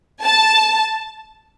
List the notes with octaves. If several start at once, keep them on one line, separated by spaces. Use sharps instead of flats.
A5